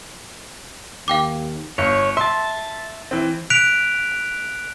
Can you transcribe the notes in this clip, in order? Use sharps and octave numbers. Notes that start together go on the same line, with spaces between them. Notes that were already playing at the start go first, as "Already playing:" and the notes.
D#2 F5 G5 D6
G1 C#5
E5 A5 C6
E3 C4
F#6 B6 D7 F7